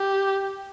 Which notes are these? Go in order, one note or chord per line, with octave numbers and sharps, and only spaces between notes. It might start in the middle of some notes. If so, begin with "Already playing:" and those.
Already playing: G4